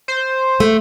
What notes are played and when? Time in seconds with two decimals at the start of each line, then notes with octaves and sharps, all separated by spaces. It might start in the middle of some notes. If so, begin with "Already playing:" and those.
0.08 C5
0.60 A3